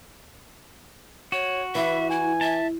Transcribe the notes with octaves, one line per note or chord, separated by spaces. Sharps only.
F#4 C#5
E3 B4 E5
E4 G#5
E5 A5